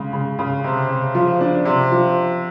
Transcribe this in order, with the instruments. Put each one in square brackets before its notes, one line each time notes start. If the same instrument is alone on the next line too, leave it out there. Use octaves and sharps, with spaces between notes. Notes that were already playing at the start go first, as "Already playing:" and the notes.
Already playing: [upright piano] C#3 G#3
C#3
C#3
C3
C3
F3
D4
C3
F3